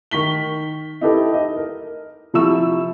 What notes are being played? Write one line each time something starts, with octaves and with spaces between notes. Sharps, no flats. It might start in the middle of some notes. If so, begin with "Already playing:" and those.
D#3 C#6 B6 G7
D#4 E4 G4 A4 B4
D#5
A#4
C3 F3 E4 C#6 E6 E7